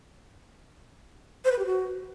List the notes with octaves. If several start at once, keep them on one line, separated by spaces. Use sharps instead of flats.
C5
B4
G4
F#4